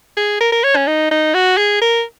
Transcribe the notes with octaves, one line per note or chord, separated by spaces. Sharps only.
G#4
A#4
A#4
C#5
C#4
D#4
D#4
F#4
G#4
A#4